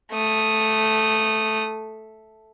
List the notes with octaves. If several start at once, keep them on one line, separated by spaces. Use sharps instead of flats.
A3 D#6